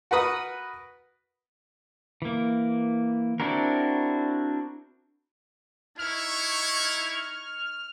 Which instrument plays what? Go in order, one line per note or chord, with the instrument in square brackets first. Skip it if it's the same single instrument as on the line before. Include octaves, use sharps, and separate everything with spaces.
[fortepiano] F#4 A#4 B4 D#6
[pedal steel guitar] E3 A#3
C4 D4 E4 F#4 A#4
[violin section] D#4 C#6 G#6 [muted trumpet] E4 [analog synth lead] F6